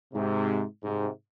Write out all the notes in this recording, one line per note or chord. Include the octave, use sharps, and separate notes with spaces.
G#2 C3
G#2 C3